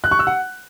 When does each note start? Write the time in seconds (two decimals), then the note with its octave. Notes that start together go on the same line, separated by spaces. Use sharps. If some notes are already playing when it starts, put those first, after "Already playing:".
0.04 F#6
0.11 C#6
0.19 E6
0.27 F#5